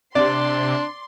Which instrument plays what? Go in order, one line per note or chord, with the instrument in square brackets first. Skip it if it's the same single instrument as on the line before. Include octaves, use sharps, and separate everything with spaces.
[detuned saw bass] C3 [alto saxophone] D4 [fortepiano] D5 [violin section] C6